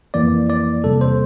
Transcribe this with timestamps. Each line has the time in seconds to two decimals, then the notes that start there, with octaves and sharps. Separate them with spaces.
0.14 F2 E3 A#3 D5
0.50 D5
0.84 E2 C3 G3 A#3 A4
1.01 C5